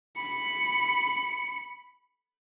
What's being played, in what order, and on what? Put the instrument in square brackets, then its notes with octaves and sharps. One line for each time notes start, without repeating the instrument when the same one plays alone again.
[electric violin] B5 C#7